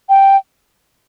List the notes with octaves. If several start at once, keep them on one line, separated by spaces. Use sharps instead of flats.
G5